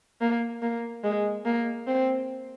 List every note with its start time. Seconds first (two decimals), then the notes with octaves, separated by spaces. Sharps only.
0.21 A#3
0.62 A#3
1.04 G#3
1.45 A#3
1.87 C4